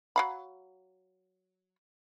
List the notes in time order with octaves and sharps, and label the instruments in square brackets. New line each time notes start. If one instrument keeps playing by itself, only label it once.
[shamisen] F#3 F5 B5